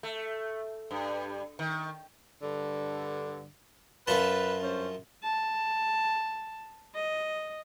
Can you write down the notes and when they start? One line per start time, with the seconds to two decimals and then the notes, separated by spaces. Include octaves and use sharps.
0.03 A3
0.91 G2
1.59 D#3
2.42 G2 D3
4.07 F#2 F4 B4 A5
4.63 G2 C#4 C5
5.24 A5
6.95 D#5